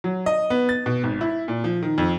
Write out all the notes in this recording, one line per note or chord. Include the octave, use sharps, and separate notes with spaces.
F#3
D#5
B3
A6
B2
G#1
E4
A#2
F3
D#3
F2